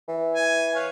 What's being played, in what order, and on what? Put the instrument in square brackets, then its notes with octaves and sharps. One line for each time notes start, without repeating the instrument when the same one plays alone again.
[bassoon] E3
[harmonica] G#5
B4 C#5 F5